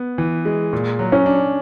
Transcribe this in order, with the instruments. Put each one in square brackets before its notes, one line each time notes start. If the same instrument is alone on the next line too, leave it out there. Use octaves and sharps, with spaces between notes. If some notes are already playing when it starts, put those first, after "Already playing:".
Already playing: [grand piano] B3
E3
G#3
A#2
F#3
[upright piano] C#4
[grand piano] D4